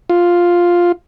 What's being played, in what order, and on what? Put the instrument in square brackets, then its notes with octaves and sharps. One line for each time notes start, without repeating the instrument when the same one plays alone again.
[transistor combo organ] F4